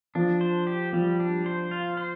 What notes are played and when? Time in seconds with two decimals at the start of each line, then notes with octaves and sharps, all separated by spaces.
0.15 F3 D4
0.41 C5
0.67 G4
0.93 F3 G3
1.20 D4
1.46 C5
1.71 F4
1.97 C5